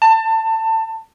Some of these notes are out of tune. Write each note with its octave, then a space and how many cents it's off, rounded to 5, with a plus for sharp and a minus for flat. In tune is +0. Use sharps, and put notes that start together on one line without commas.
A5 +20